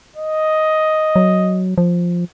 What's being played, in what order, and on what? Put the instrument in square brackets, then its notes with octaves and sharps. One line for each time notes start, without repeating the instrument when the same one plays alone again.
[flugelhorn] D#5
[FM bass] F#3
F3